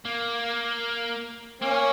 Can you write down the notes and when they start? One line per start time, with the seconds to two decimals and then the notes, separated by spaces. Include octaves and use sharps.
0.06 A#3
1.62 A#3 C#4